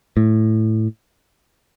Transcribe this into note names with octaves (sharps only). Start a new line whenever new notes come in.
A2